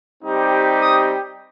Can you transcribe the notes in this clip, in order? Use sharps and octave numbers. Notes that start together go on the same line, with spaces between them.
G3 C4 D#4 G4
D#6